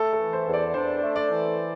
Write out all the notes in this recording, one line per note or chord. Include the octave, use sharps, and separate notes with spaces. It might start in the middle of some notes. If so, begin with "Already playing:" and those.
Already playing: A3 A4
A4
E3
C5
E2
D5
D4 C5
A3
D5
E3